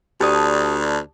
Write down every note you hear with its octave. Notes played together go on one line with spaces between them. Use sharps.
D2 G4 D5 A5 D#6